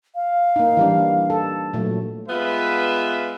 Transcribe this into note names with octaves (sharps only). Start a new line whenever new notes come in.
F5
A#3 D#4
E3 G3 D4
A4
A#2 F#3 A3
G#3 B3 F4 B4 E5